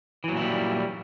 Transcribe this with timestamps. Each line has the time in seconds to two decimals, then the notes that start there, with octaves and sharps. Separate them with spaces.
0.24 E3
0.28 F#3
0.32 A#2
0.37 E4
0.41 G3